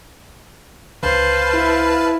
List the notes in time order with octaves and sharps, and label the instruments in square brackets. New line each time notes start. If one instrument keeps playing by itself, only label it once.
[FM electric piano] C#2 D3 [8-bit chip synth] B4 F5 A5 [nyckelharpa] C5
[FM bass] E4